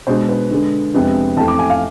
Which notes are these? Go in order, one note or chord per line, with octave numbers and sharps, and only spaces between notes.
B2 G#3 D4 C5
B4
D3 G#3 D4
F2 C3 G#3 B3 D4
F2 E3 A3 A5
D6
G#5
F5